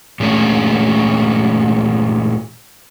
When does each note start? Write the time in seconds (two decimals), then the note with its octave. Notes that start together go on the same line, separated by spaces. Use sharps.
0.20 A#2 E3 G#3 A3 C#4 D4